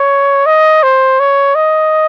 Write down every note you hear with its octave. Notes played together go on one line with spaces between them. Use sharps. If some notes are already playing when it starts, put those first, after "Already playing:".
Already playing: C#5
D#5
C5
C#5
D#5